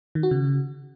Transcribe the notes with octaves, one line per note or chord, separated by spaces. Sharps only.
D#3
F#4
C#3